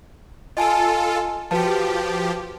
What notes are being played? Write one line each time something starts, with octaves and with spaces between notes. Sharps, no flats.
F4 A4 D#5 G#5 A5
F3 F#4 G4 B4 A5